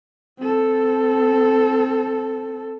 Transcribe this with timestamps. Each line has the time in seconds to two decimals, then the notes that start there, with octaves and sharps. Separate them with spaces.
0.39 C4 A4